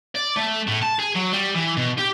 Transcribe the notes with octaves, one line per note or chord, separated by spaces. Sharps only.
D5
A3
A2
A5
G#4
F#3
G3
E3
B2
G4